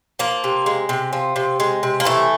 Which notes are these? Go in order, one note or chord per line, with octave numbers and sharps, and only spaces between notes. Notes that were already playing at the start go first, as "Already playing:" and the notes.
F3 A#3
C3
G#3
C3
F3
C3
G#3
C3
A#3
E3 A3